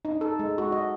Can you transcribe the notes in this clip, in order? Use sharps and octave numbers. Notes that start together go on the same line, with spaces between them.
D#4
A4
G#3
F#4
D#5